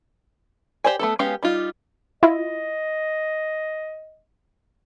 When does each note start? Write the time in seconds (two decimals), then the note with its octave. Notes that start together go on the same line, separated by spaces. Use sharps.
0.84 G4 C5 D5 G#5
0.99 A3 B3 A4
1.19 G#3 B3 C#4 G4 F5
1.43 G3 D#4 F4
2.23 E4 F4 D#5